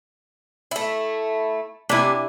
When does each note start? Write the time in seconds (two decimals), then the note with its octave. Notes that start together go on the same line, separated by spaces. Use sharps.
0.71 A3 E4
1.89 C3 D4 E4 G#5